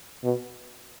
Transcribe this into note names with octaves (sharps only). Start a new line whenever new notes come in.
B2